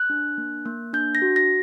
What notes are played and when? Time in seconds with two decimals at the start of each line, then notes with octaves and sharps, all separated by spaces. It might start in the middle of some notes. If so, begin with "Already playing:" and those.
Already playing: F#6
0.10 D4
0.38 A#3
0.65 A#3
0.93 D4 G6
1.15 A#6
1.22 F#4
1.36 A#6